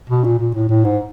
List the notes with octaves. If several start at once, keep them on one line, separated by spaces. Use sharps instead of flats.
B2
A#2
A#2
A2
A2
G#2